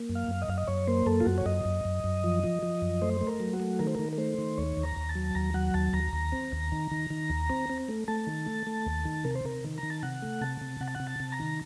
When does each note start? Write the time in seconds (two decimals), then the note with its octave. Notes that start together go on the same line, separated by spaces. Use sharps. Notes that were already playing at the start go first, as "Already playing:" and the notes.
Already playing: A#3
0.09 F#2
0.15 F5
0.28 F#2
0.42 D#5
0.48 F#2 F5
0.58 D#5
0.67 F#2 C#5
0.88 A#3 C5
1.06 F#2 A4
1.21 F4
1.26 F#2 F#4
1.38 C#5
1.46 F#2 D#5
1.65 F#2
1.85 F#2
2.04 F#2
2.24 F3
2.44 F3
2.63 F3
2.82 F#2
3.02 A3 C5
3.21 A3
3.27 A#4
3.40 F#3
3.53 F#4
3.60 A3
3.79 D#3 A#4
3.87 C5
3.95 D#3 A#4
4.13 A#4
4.18 A3 C5
4.38 D#3
4.58 D#2 C#5
4.77 D#2
4.83 A#5
4.96 D#2
5.09 A5
5.15 F#3
5.35 D#2 A#5
5.54 F#3 F#5
5.74 D#2 A5
5.93 D#2 A#5
6.13 D#2
6.32 C4
6.52 D#2
6.72 D#3
6.92 D#3
7.10 D#3
7.30 D#2
7.50 C4
7.70 C4
7.88 A3
8.08 A3 A5
8.27 D#3
8.46 A3
8.67 A3
8.86 D#2
9.05 D#3
9.25 C3 A#4
9.36 C5
9.45 C3 A#4
9.64 D#3
9.78 A#5
9.83 D#3
9.90 A5
10.03 C3 F#5
10.22 A3
10.41 C3 A5
10.61 C3
10.81 C3 F#5
10.87 A5
10.95 F#5
11.00 C3
11.07 A5
11.20 C3
11.32 A#5
11.40 D#3